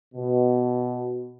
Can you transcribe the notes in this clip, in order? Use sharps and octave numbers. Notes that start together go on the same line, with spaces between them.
B2